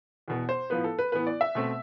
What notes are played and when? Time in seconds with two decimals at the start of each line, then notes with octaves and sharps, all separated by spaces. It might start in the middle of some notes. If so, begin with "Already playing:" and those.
0.28 E2 B2 B3
0.49 C5
0.70 A2 F3 B3 B4
0.84 A4
0.99 B4
1.12 A2 E3 B3 B4
1.27 D5
1.41 E5
1.55 B2 A3 C4